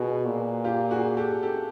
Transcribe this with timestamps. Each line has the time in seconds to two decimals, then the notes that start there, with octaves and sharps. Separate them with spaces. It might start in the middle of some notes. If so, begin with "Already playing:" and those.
Already playing: B2 F#4 G#4
0.26 A#2
0.64 F4 G4
0.90 F#4 G#4
1.17 G4 A4
1.42 G4 A4